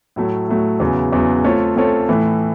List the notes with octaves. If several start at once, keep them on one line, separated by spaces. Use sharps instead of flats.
A2 F#3 A3
A2 F#3 A3
E2 C#3 F#3
E2 C#3 F#3
A3 C4 F4 A4 C#5
A3 C4 F4 A4 C#5
A2 E3 A3